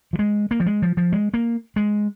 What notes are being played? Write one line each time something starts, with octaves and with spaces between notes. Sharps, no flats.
F3
G#3
A#3
F3
G#3
F3
F3
G#3
A#3
G#3